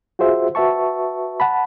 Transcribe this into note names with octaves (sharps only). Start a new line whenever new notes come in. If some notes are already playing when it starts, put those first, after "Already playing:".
F4 F#4 G#4 C5 E5
F#4 B4 E5 A5 C#6
F#5 A5 B5